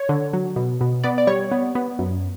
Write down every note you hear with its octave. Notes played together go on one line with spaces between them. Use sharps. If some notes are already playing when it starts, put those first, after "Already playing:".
Already playing: C#5
D3
F#3
B2
B2
B3 D5
D5
G3 C#5
B3
B3
F#2